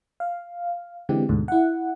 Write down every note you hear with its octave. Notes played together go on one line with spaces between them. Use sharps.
F5
D3 E3 G#3 C4 G4
D2 G#2 B2 D3
E4 F#5